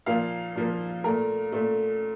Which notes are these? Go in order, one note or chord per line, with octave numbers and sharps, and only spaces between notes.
A#2 F3 A#3 F5
A#2 F3 A#3
A#2 A3 A#4
A#2 A3